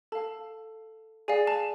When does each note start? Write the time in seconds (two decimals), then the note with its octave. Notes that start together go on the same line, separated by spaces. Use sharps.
0.12 A4 F5 A5
1.28 G#4 D5 F5 G#5
1.47 A5